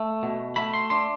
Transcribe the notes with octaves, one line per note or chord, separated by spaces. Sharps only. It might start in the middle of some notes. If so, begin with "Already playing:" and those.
Already playing: A3
B2
A3 B5
C6
D4 C6